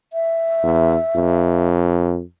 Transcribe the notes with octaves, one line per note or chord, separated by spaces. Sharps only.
E5
E2
F2